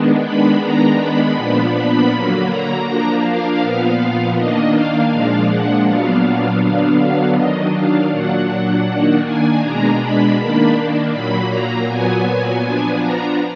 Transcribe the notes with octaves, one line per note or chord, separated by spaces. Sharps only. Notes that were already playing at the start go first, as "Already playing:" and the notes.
Already playing: D#3 G#3 B3 D4
B5
D#3 G#3 B3 D4 A#5
B5
A#2 F3 B3 D4
B5
D3 F#3 A#3
A#5
F3 A#3 D4
F5
A#2 F3 B3
D#3 A#3 D4 D#5
F5
A#2 F3 G#3 D4
F#5
A#2 F#3 B3 D4 F5
D3 F#3 B3 D4 F5
D#3 F#3 D4 D#5
F5
A#2 F#3 D4 F#5
D#3 A#3 D4
G#5
B2 G#3 D4 A#5
B5
D#3 A#3 D4 B5
A#2 F#3 A#3 B5
A#5
A#2 F#3 B3 G#5
F3 B3 D4
A#5